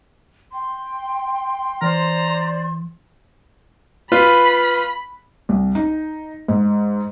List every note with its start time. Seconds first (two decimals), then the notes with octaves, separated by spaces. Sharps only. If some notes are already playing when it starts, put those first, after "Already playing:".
0.52 G5 C6
1.82 E3 C5 D5 A#5
4.12 F4 B4 B5
5.49 C2
5.75 D#4
6.48 G#2